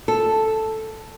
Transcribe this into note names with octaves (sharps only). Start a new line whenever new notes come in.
A4